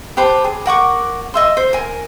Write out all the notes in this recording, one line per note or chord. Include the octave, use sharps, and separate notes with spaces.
G4 B4 C5 A5
G#4
A#4 F#5 C#6 D6
D#5 E5 C6
C5
A#4 G#5